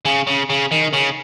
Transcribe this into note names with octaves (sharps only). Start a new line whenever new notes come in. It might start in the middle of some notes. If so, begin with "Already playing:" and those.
C#3
C#3
C#3
D#3
C#3